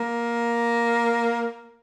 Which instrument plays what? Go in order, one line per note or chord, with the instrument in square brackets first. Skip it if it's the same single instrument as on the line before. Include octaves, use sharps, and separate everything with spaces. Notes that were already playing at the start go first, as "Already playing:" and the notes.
Already playing: [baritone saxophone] A#3